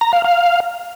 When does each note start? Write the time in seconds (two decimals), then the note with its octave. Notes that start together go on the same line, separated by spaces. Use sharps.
0.01 A#5
0.13 F5
0.24 F5